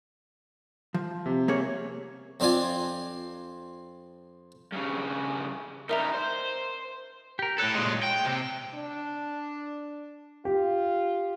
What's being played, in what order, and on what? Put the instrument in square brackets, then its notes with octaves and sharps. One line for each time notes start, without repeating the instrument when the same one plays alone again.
[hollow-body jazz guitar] F3
[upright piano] C3
[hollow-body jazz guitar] A#3 G#4 C#5
[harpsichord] F2 C4 D4 F4 D5 G#5
[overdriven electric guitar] G2 C#3
[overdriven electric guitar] G3 D#4 [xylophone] A#4 E5 A#5
[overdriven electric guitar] C5
[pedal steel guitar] G4 A#4
[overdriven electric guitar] A2 A4 [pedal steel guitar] C#5 F#6
[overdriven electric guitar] A#2 G#3
G5
C3
[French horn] D4
[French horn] F4 [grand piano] G4